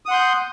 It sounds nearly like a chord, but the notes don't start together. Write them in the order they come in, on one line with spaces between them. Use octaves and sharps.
D#6 F#5 C6 G6